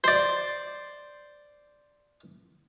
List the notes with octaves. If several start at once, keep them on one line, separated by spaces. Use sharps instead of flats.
C5 D5